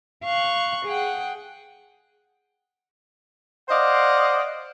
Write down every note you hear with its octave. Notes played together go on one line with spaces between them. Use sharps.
F5 C#6 F#6
G#4 F#5 G5
C5 D5 D#5 F5 F#5